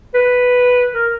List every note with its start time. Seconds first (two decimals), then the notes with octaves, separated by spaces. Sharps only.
0.14 B4
0.94 A#4